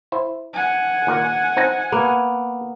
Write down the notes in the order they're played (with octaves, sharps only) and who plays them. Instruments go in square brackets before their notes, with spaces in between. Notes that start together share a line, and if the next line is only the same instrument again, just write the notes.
[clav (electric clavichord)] E4 C5
[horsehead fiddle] F#5 G#5
[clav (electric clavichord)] D#2 A#2 A#4
C4 D#4 A5
[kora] A#3 B3